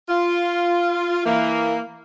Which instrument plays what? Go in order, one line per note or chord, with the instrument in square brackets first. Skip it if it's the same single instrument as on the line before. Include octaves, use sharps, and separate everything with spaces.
[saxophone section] F4
E3 A#3